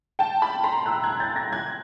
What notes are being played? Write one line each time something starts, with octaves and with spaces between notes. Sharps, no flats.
G5 A5
A5 B5
A#5 C6
E6 F#6
F#6 G#6
G6 A6
G#6 A#6
F#6 G#6